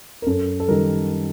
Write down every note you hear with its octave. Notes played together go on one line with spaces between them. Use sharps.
A#4
F#2 A4
A4
D#3 G3 A#4